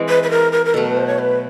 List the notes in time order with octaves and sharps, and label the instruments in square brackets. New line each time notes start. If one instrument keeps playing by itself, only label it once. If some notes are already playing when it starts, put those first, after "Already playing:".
Already playing: [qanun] E3 G#3 C4 E4
[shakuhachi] B4
B4
A#4
A#4
A#4
[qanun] B2 F#3 A3 [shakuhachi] A4
[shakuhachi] B4
C5
C#5
B4